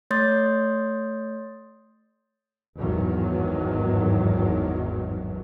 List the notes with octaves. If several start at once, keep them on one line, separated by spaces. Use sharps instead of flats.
A3 C#5 C6 D#6 G6 A6
G#1 E2 G2 D#3 F#3